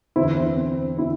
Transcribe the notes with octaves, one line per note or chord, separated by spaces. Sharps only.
E2 D3 C4 E4
C4
C4
D3 C4 E4